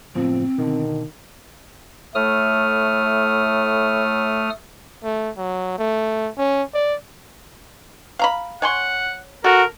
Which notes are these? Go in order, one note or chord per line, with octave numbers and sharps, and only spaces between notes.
F#1 A2 F3 B3 C4
B2 D3 D#3
A2 A3 D#6 F6
A3
F#3
A3
C#4
D5
F5 A#5 B5
C#5 F#5 G#5 C6
F#4 A4 A#4